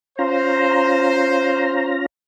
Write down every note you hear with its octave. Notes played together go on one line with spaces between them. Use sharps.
C#4 F4 C5 A#5